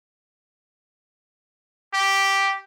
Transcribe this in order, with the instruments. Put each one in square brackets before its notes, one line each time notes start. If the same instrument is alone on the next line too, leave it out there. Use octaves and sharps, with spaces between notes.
[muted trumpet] G4